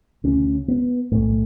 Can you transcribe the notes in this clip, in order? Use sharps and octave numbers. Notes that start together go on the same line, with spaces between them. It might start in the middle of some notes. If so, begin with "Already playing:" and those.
D2 C#3 C#4
B3
B1 A2 A3